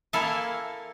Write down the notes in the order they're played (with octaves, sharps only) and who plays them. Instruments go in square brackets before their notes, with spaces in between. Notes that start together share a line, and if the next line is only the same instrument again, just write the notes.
[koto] A#3 E4 A4 F5 G#5 A5